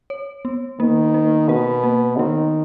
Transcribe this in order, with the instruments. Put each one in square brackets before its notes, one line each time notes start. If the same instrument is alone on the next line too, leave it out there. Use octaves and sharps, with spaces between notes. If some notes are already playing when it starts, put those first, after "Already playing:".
[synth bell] C#5
B3
[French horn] D#3 [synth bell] A#3
[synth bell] A#3
[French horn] B2 [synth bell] A#4
[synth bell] A#3
[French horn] D#3 [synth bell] B3